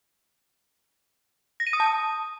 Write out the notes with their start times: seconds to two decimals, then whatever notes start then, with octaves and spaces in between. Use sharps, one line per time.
1.60 A#6
1.67 D#7
1.73 D#6
1.80 A5
1.86 D#6